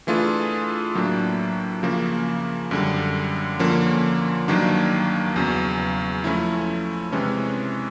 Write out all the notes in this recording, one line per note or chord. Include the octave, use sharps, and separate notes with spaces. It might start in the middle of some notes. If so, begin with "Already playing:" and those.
E3 A3 D4 F4 G#4
A2 F#3 A#3 D4
C#3 F3 A#3
F#2 D3 G3
D3 F3 A#3 C#4
G2 D#3 F#3 A#3 D4
E2 C#3 F#3
F3 A3 C#4 E4
C3 E3 G#3 C#4